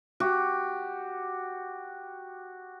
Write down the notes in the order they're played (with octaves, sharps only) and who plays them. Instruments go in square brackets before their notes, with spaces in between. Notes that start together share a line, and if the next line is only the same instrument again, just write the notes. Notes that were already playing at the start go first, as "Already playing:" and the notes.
[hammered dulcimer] F#4 G4